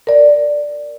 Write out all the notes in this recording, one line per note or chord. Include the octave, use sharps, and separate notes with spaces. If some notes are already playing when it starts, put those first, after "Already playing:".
A#4 D5